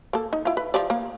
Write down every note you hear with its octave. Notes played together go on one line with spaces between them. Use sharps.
A#3 A4
D#4
E4 F4
B4
F3 G4 D5
A#3